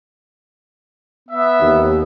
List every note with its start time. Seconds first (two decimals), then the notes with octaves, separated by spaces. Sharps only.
1.29 B3 E5
1.61 D#2